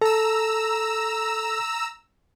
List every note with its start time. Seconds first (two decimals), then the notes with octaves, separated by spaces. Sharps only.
0.01 A4 A#5 E6